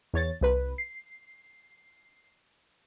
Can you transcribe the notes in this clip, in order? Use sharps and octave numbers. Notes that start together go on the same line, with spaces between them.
E2 C#5 A6
C2 B4
C7